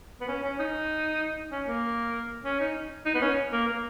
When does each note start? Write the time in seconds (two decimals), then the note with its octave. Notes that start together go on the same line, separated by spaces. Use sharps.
0.21 B3
0.28 C#4
0.44 C#4
0.59 D#4
1.51 C#4
1.67 A#3
2.45 C#4
2.60 D#4
3.06 D#4
3.14 B3
3.22 C#4
3.52 A#3
3.68 A#3